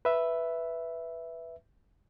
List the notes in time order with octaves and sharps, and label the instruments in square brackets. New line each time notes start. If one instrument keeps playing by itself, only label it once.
[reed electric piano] B4 E5